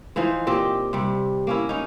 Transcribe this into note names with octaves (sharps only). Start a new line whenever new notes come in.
E3 F3 D#4 C5
A#2 C4 G4 D#5
C3 G3
A#3 C#4 E4
C#4 D#4